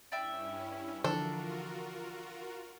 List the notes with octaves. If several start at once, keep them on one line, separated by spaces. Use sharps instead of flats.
G2 C#4 E4 D5 E5 G5
D3 E3 F3 D4 F4 F#4 A4 A#4